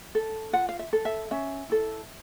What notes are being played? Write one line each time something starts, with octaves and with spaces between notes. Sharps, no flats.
A4
F4 F#5
F5
E5
A4
E5
C#4 E5
E4 A4